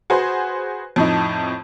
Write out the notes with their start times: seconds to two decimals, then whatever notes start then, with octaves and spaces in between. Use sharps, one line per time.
0.10 F#4 G#4 B4 C5
0.96 F2 A2 D#4